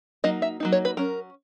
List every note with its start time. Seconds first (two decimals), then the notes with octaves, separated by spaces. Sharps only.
0.24 F#3 A#3 D#4 D#5
0.42 E5
0.60 F#3 A#3 D#4
0.72 C#5
0.85 B4
0.97 F#3 C#4 A#4